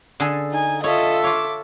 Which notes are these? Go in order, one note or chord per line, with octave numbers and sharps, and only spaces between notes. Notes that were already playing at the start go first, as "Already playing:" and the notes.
D3 G#4 A4
D#4 G#5
F4 A4 C#5 D#5 E5
F4 C#5 D6